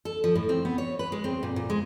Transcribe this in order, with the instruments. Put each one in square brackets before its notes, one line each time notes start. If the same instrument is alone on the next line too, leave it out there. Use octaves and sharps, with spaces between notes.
[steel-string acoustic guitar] A4
F3
A2
C4
B3
C#5
B4
G#3
C4
A#2
A#2
G#3